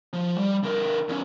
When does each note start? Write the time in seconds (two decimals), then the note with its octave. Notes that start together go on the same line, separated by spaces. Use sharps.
0.13 F3
0.38 G3
0.63 D3 A#4
1.09 E2 C#4